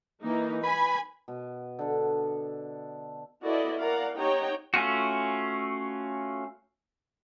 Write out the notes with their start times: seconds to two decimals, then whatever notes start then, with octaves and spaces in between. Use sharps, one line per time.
0.23 E3 A#3 D#4
0.64 B4 G#5 B5
1.28 B2
1.79 D3 A4
3.42 E4 F#4 A4 B4 D5 D#5
3.77 A#4 D5 F5 F#5 A#5
4.16 D#4 G4 C#5 F#5 G5 A#5
4.74 A3 C#4 F4 F#4